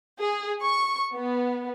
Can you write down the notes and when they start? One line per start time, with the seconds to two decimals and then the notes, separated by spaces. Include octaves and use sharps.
0.21 G#4
0.62 C#6
1.15 B3